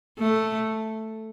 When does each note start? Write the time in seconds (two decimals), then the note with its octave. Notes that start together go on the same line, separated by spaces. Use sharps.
0.19 A3